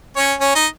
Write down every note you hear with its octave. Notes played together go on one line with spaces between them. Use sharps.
C#4 C#5
C#4 C#5
D#4 D#5